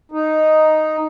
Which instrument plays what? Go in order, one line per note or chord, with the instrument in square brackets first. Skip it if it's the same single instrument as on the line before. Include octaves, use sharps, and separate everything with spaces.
[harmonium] D#4